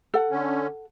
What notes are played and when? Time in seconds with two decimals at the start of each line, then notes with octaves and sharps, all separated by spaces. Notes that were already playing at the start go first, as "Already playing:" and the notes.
0.14 A4 F#5
0.31 D3 C#4